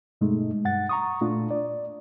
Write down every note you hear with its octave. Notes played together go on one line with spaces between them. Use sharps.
G2 B2 G#3 A3 D#4
G2 F#5 A6
A#5 C#6 D#6
A#2 A3 D4 F4
D5